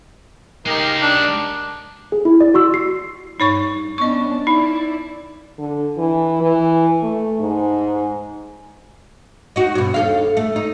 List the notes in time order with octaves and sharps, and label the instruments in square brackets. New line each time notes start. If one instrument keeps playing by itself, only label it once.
[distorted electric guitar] G#3 F5 [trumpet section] D#4 G4 A#4
[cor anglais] D4
[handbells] G#4
E4
D5
F#4 C6 E6
C7
[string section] G2 [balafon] D#4 C#5 C#6
[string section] B3 C#4 D4 [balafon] D#5 C#6
[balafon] D#4 [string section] E4 D5
[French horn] D3
E3
E3
A3
G#2
[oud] D#4 F#4
G2 B2
D#2 A4 F5
A3
D#4